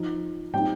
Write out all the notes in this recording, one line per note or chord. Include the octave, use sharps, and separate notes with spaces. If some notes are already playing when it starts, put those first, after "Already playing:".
Already playing: F3 D#4
A#2 G3 C4 D#4 G5